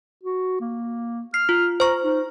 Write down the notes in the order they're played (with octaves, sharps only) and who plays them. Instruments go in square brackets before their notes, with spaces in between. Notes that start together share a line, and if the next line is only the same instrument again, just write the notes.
[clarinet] F#4
A#3
[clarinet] F6 [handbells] C7
[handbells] F4
[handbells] C5 C#6 [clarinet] A#5
[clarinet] D#4